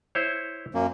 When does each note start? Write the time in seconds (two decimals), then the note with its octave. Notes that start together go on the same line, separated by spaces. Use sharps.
0.15 E4 C5 C#5
0.74 F#2 A#3